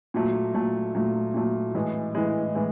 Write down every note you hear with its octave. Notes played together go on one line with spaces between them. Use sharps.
A#2 F#3 A3
A#2 F#3 A3
A#2 F#3 A3
A#2 F#3 A3
A2 E3 G#3
A2 E3 G#3
A2 E3 G#3